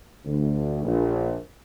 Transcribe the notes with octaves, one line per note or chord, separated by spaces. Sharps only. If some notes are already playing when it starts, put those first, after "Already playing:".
D2
A#1